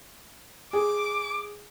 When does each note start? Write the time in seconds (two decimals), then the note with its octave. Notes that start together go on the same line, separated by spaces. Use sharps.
0.73 G#4 D6